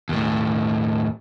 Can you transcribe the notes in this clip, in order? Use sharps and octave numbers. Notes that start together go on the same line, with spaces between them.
D#2 A2